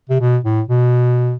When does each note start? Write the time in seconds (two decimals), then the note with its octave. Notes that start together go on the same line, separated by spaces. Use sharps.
0.10 C3
0.21 B2
0.45 A2
0.69 B2